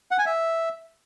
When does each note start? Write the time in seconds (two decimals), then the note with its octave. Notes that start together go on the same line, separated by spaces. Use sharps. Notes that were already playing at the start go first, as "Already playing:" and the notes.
0.11 F#5
0.19 G#5
0.26 E5